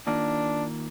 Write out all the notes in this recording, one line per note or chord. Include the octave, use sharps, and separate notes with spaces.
D#3 A#3 D4 F4